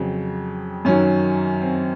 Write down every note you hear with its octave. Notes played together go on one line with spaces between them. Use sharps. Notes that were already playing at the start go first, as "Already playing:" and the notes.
Already playing: F2 C#3 F#3 C4
F#2 D#3 F#3 C#4
C4